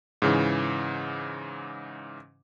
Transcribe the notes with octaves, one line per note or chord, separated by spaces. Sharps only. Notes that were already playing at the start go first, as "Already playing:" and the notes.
G#2 C#3 E3